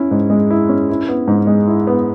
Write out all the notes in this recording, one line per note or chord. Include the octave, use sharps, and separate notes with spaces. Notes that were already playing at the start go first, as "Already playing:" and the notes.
Already playing: C#4 E4
G#2
G#3
E4
C#4
E4
B3
G#2
G#3
E4
B3